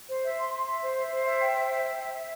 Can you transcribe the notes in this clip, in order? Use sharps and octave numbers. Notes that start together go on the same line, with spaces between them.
C5
E5
C6
C6
E5
C5
E5
C5
E5
G5
C5
E5
E5
E5
E5